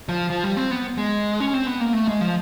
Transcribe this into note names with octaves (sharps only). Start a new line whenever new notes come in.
F3
F3
G3
C4
B3
G#3
C#4
C4
B3
A#3
A3
G#3
F3